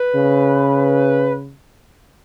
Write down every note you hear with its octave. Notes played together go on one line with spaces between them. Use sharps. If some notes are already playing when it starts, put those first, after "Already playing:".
Already playing: B4
C#3